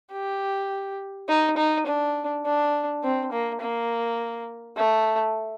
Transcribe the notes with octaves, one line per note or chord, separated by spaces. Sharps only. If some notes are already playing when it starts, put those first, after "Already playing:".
G4
D#4
D#4
D4
D4
C4
A#3
A#3
A3